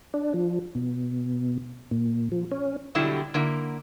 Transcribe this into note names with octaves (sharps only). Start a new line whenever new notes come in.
D4
F3
B2
A#2
F3
C#4
B2 D3 F#3 G3 E4 G4
D3 A#3 E4